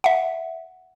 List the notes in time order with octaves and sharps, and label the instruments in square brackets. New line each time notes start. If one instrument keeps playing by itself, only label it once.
[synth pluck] E5 F#5